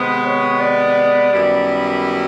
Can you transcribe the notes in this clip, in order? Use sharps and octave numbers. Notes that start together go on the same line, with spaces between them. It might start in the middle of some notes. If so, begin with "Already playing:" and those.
Already playing: C3 D#3 G#3 B3 C5
C#5
D5
F#2 D#3 G3 B3 E4